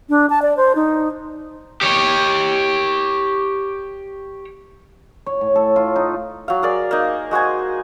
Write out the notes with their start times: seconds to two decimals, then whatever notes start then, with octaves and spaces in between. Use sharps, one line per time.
0.09 D4
0.30 A5
0.42 D5
0.57 C5
0.75 D#4
1.81 G4 C#5
5.26 C#5
5.41 A2
5.56 A4
5.76 F4
5.96 D#4
6.48 F#3 F5
6.62 G#4 A#4 D5
6.91 A#3 D#4
7.31 G#3 F#4 C5 G#5